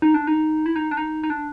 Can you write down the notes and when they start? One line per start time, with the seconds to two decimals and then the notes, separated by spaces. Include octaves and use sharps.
0.02 D#4
0.14 D4
0.27 D#4
0.66 E4
0.76 D#4
0.91 D4
0.97 D#4
1.23 D#4
1.30 D4